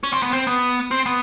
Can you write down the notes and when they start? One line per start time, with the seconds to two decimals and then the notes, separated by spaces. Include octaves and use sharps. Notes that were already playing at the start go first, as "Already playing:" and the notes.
0.03 C#4
0.13 C4
0.22 B3
0.33 C4
0.47 B3
0.91 C4
1.06 B3